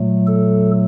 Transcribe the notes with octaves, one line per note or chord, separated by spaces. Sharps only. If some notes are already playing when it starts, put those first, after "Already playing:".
Already playing: A#2 F#3 A3
A4